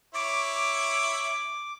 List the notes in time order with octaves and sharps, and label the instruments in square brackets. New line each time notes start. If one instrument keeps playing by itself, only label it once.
[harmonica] E4 C#5 [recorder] D6